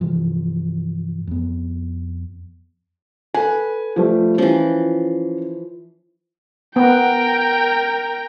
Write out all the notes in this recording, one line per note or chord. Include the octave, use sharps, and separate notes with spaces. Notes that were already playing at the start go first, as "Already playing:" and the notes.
G2 C3 E3 F3
F2 B3
A4 B4 G#5
F3 G3 A3
E3 F3 C#4
B3 A#4 G5